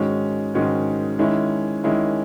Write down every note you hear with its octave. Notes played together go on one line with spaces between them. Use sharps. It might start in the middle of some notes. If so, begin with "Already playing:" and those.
Already playing: G#2 D#3 G#3 C#4 F#4
G#2 D#3 G#3 C#4 F#4
D#3 G#3 C#4 E4
D#3 G#3 C#4 E4